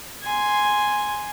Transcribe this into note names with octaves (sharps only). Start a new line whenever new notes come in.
G#5 C6